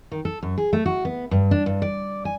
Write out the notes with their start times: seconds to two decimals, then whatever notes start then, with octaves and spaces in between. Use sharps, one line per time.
0.12 D#3
0.25 A4
0.43 F#2
0.58 G#4
0.73 A3
0.86 F#4
1.05 B3
1.31 G2
1.51 D4
1.66 G2
1.82 D5
2.25 G#5